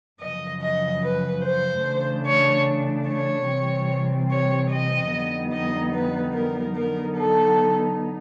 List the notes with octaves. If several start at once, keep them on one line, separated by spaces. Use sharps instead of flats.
F#2 C#3 F3 D#5
D#5
B4
C5
C#3 E3 A3 D4
C#5
C#5
C3 E3 G3 C4
C#5
D#5
F2 D3 G3 B3 D#4
D#5
B4
A#4
D3 F#3 B3 D#4 A#4
A4